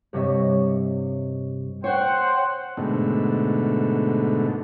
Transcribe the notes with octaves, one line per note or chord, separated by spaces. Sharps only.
G2 C3 C#5 D#5 E5
C5 C#5 F#5 G5
G#2 B2 D3 A3